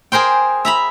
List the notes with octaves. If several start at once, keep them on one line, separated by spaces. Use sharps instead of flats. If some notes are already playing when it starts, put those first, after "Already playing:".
G#4 A#4 C5 G5
E5 A#5 B5